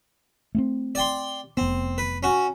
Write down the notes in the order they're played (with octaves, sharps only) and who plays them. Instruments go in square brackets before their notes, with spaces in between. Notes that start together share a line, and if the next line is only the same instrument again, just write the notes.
[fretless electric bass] A3 B3 C4
[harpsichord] D5 G5 C6
[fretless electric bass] F1 B3 [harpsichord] C4
[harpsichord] B4
C#4 F#4